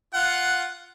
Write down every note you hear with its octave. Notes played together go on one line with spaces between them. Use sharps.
F4 F#5